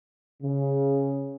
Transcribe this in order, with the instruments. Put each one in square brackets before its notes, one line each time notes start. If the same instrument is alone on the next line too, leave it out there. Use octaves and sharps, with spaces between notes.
[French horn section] C#3